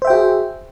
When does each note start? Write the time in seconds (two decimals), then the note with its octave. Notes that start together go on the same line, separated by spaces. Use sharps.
0.02 C5
0.05 E5
0.07 G5
0.10 F#4
0.13 G#4